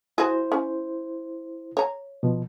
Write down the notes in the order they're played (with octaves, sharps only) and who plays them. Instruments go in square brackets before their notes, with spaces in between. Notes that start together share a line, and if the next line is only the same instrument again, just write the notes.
[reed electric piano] E4 C5 [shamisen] F#4 G#4
[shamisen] C#4
C#5 A#5
[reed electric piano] B2 F3